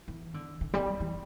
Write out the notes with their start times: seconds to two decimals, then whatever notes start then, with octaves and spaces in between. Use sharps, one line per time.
0.08 E3
0.34 D3
0.61 D3
0.74 G3
1.00 E3